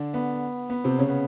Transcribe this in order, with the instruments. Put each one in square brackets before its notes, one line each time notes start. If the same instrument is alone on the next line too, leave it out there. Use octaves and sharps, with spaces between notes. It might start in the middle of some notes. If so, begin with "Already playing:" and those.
Already playing: [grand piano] D3 D4
B3
B3
C3 C4
C#3 C#4
B3